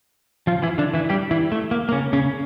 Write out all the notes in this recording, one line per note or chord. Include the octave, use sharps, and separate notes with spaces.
F3 F4
E3 E4
D3 D4
E3 E4
G3 G4
E3 E4
A3
A#3
A#3
C#3 C#4
C#3 C#4